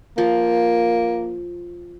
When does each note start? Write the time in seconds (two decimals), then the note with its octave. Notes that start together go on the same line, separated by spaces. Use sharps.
0.18 F3 A#3